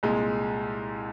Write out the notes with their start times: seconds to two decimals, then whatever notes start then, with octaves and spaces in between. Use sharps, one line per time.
0.03 C2 A#2 G#3